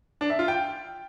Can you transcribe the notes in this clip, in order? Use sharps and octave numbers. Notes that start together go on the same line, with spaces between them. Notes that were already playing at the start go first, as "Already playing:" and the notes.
D4
E5
F4
G5